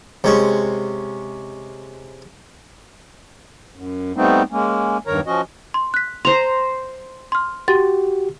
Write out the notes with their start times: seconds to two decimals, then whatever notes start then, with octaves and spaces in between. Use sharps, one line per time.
0.24 C3 G#3 C#4
3.74 F#2
4.16 G3 A3 B3 C4 D#4
4.51 G#3 A#3 C#4
5.07 E2 G2 D#3 A#4 C#5 A#5
5.27 F3 C#4 F#4 D#5
5.74 C6
5.94 F#6 B6
6.25 C5 A#5 C6
7.32 C6 F6
7.68 F#4 G4 C6 A6